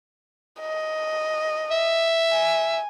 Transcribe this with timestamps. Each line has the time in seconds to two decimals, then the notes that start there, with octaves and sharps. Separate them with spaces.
0.60 D#5
1.71 E5
2.32 G#5